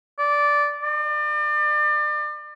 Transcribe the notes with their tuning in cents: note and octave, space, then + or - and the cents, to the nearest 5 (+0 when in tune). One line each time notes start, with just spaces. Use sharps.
D5 -10
D5 +35